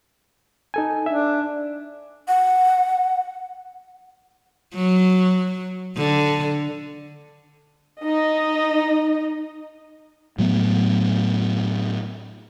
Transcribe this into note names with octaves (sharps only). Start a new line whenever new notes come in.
D#4 A4 G#5
D4 E5
F#5
F#3
D3
D#4 D#5
A2 F#3 A3 B3